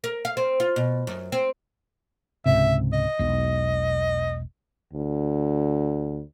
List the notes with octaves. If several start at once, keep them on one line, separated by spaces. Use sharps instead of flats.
A#4
F5
C4
F4
B2
F#2
C4
C#2 G#2 C3 E5
D#5
E1 B1
D2